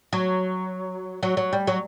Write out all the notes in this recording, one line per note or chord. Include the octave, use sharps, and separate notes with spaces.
F#3
F#3
F#3
G3
F#3